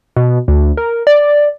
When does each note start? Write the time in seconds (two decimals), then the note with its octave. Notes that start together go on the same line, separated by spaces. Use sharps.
0.17 B2
0.48 D2
0.77 A#4
1.07 D5